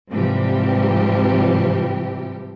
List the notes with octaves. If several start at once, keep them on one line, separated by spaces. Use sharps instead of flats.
G#2 C3 E3 F3 G3 G4